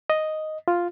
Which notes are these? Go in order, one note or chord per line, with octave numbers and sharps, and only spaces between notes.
D#5
F4